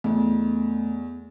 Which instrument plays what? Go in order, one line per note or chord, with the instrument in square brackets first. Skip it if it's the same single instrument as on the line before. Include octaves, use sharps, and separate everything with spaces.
[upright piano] E2 [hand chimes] A3